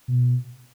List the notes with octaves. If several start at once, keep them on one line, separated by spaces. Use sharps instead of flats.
B2